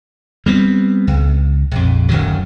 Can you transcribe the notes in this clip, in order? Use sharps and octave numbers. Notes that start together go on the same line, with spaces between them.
G3 B3 C4
C#2
A#1 F2
D1 F#2 D#3 F#3